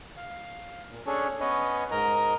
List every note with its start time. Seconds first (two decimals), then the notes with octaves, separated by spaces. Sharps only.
0.17 F5
0.90 A#2
1.06 C#4 D4 G#4 A4 C#5
1.40 B3 C#4 B4 C#5 D#5
1.91 G#2 A#4 D#5 A#5